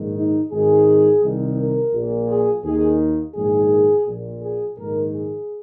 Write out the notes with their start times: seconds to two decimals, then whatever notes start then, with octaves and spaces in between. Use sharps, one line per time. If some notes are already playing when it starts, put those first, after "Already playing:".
Already playing: A#1 G#2 D#3
0.15 D#4
0.51 G#1 G#2 D#3 G#4
1.22 C2 C3 D#3
1.57 A#4
1.93 A#1 A#2
2.28 G#4
2.64 D#2 D#3 G#4
3.35 A#1 G#2 D#3 G#4
4.06 A#1 A#2
4.42 G#4
4.77 A#1 G#2 D#3 A#4
5.13 G#4